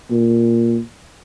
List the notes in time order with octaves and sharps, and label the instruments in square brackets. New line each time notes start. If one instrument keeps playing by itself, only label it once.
[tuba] A#2